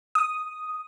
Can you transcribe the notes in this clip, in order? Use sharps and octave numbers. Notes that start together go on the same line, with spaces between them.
D#6